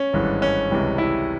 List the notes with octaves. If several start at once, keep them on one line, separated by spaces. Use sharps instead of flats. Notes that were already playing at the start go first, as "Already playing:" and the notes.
Already playing: C#4
G#1 G2 E3 G#3
C#4
C#2 C3 E3 G3
E4